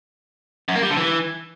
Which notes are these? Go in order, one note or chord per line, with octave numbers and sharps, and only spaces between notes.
F#2
A#3
G3
D3
E3